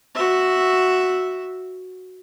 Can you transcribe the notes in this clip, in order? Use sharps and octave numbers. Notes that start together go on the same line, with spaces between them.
F#4 E5